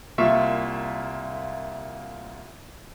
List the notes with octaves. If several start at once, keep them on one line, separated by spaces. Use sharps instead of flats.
C2 A#3 F4 E5 C#6